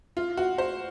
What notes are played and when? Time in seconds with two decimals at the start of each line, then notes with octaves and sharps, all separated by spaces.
0.17 F4
0.37 F#4
0.58 C5